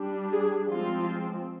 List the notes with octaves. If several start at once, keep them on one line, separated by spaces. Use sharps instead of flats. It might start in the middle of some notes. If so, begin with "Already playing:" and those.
Already playing: G3 D4
G#4
F3 G#3 C4 F4